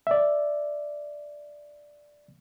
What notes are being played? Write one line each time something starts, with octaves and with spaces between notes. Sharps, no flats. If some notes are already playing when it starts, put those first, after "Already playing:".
D5 E5